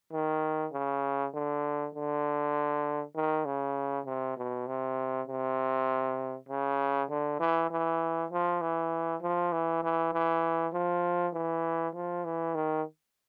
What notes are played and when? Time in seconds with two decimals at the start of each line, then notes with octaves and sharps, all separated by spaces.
0.12 D#3
0.73 C#3
1.34 D3
1.94 D3
3.15 D#3
3.45 C#3
4.06 C3
4.37 B2
4.67 C3
5.27 C3
6.49 C#3
7.09 D3
7.40 E3
7.70 E3
8.31 F3
8.61 E3
9.21 F3
9.52 E3
9.83 E3
10.13 E3
10.73 F3
11.34 E3
11.94 F3
12.25 E3
12.55 D#3